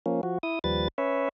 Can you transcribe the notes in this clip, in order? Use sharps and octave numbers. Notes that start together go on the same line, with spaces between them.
F3 A#3 C#4
F3 F#4
E4 D#6
D#2 F3 G3 B4 A6
C#4 B4 C#5 E5